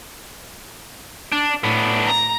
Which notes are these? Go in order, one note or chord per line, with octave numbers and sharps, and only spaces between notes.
D4
A2 B3 D4
A#5 A#6